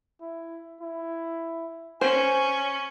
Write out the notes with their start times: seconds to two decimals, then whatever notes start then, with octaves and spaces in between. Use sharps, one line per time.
0.21 E4
0.81 E4
2.01 C#4 C5 G#5